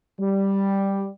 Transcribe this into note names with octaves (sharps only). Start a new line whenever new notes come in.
G3